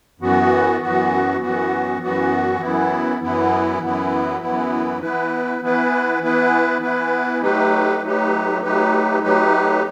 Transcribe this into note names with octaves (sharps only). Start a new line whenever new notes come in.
F#2 E3 B3 F#4
F#2 E3 B3 F#4
F#2 E3 B3 F#4
F#2 E3 B3 F#4
F#2 E3 B3 E4
F#2 E3 B3 E4
F#2 E3 B3 E4
F#2 E3 B3 E4
E3 B3 E4 B4
E3 B3 E4 B4
E3 B3 E4 B4
E3 B3 E4 B4
F#3 A3 D#4 G4 B4
F#3 A3 D#4 G4 B4
F#3 A3 D#4 G4 B4
F#3 A3 D#4 G4 B4